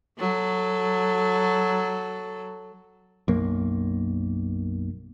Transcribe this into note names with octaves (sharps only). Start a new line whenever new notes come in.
F#3 A4
B1 F#2 A#3